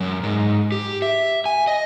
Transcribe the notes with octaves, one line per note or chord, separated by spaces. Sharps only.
F#2
G#2
G4
E5
G#5
D#5